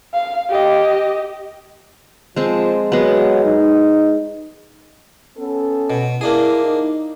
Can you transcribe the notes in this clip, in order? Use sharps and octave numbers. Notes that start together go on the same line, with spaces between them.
F5
G4 D#5
F3 G#3 C4 A5
F#3 G#3 B3
D#4
B3 C#4 A4
B2
A#3 D4 E4 G#4
D#4